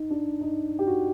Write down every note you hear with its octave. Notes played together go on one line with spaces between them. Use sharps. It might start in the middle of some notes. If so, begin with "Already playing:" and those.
Already playing: D#4
D4
D#4
G4
F#4